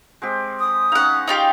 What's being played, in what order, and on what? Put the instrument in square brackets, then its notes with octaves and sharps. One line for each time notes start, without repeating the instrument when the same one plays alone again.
[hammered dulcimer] G#3 C4 G4
[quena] D#6
[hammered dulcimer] C#4 D#4 [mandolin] F5 F#5
[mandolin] D#4 F4 G4 [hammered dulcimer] C#5 F5 C#6